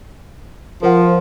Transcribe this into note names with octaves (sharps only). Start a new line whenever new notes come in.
F3 A#4 C5 F#5